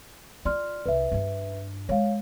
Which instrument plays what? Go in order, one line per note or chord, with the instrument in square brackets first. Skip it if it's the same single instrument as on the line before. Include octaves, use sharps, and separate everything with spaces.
[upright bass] F4 [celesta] D5 C6 F6
[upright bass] C2 [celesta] B4 E5
[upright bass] G2 D4
[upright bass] G#3 [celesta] C#5 F5